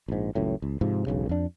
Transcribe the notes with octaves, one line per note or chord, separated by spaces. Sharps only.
A#1 G#2
F#1 C#2 F#2 A2
C#2
G#2 C3 F3
E1 B1 C#3
F2 D4